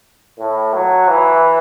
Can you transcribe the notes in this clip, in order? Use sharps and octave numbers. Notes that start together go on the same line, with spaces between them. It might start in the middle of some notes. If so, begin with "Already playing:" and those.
A2
F#3
E3